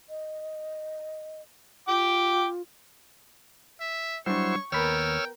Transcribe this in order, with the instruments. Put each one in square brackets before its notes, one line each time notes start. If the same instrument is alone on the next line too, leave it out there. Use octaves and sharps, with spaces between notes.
[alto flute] D#5
[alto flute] F4 [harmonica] G5 D6
[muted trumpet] E5
[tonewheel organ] F#3 E4 C5 [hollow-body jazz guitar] G3 D4 [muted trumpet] C#5 [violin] C#6
[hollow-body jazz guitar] D#2 B5 [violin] B3 A#4 [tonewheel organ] C#5 E6 F6 [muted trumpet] G5